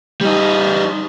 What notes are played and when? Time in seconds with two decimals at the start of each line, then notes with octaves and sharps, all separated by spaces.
0.21 G3 D#4